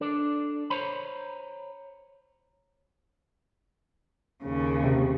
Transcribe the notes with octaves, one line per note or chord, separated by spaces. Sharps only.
D4 A4 D5
C5 C#5 A#5 B5
D#2 C#3
C3